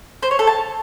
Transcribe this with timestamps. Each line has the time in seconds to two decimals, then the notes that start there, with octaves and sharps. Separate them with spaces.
0.23 C5
0.31 C#5
0.39 A4
0.47 A5